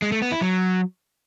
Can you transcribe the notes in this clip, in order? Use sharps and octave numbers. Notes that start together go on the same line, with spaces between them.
G#3
A3
B3
E4
F#3